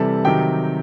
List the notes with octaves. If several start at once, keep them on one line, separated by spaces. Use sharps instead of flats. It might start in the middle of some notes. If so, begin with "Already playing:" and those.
Already playing: C3 E3 G3 A4 A5
C3 D#3 F#3 G4 G5